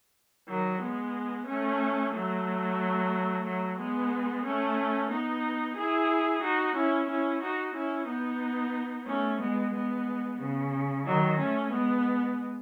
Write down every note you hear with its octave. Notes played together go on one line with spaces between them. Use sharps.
D#3 F#3
G#3 B3
A3 C#4
F#3 A3
F#3 A3
G#3 B3
A3 C#4
B3 D#4
E4 G#4
D#4 F#4
C#4 E4
C#4 E4
D#4 F#4
C#4 E4
B3 D#4
A3 C#4
G#3 B3
G#3 B3
C#3
D#3 F#3
A3 C#4
G#3 B3